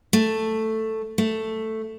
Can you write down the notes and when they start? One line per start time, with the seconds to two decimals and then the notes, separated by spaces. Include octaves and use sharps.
0.13 A3
1.18 A3